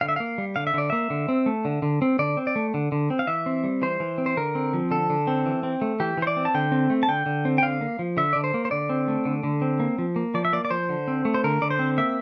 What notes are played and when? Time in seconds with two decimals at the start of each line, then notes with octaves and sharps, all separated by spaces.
0.01 D3 F5
0.09 E5
0.16 A#3 F5
0.38 G3
0.56 D3 F5
0.67 E5
0.74 D3 D5
0.90 A#3 E5
1.10 D3
1.29 C4
1.46 A3
1.65 D3
1.82 D3
2.02 C4
2.19 D3 D5
2.37 C4
2.47 D5
2.56 A3
2.74 D3
2.92 D3
3.10 C4
3.19 F5
3.27 E3 E5
3.46 C4
3.64 G3
3.82 E3 C5
4.00 E3
4.18 C4
4.26 C5
4.37 D3 A#4
4.55 C4
4.74 F3
4.91 D3 A4
5.10 D3
5.27 C4
5.46 E3
5.63 C4
5.82 A3
6.00 E3 G4
6.17 E3 C5
6.27 D5
6.37 C4
6.45 A5
6.54 D3 G5
6.72 C4
6.90 A3
7.03 A5
7.08 D3 G5
7.26 D3
7.45 C4
7.58 G5
7.62 D3 F5
7.81 A#3
7.99 F3
8.17 D3 E5
8.33 D3 D5
8.44 C5
8.54 A#3
8.65 C5
8.71 D3 D5
8.90 C4
9.08 A3
9.25 D3
9.43 D3
9.62 C4
9.80 A#3
9.98 F3
10.16 A#3
10.34 F3 D5
10.45 E5
10.53 A#3 D5
10.65 D5
10.71 F3 C5
10.89 D3
11.08 C4
11.25 A3
11.34 C5
11.44 D3 A#4
11.61 D3 D5
11.71 C5
11.79 C4
11.98 A#3 E5